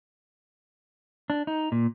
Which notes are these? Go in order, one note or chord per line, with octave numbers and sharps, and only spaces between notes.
D4
D#4
A#2